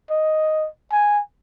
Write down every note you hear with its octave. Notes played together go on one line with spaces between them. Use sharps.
D#5
G#5